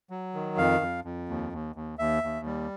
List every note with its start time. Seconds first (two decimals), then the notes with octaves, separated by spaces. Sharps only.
0.10 F#3
0.34 D#3
0.58 F2 F5
0.81 F2
1.05 F2
1.29 D#2
1.53 D#2
1.76 D#2
1.99 D#2 E5
2.23 D#2
2.46 G3